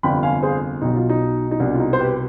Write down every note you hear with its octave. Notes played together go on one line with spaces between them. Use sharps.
G1 F2 C3 G5 B5
F5 G#5
G#4 C5
B1 B2 D#4
F4
D#4
D#4
C2 B2 D4
F4
D#4
C5
G4 B4